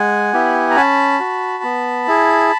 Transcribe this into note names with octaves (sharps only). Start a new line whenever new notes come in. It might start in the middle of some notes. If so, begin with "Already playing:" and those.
Already playing: G#3 F#5 G#5
B3 E4 G4
A#5
C#4 A5 B5
F#4
B3
E4 G#4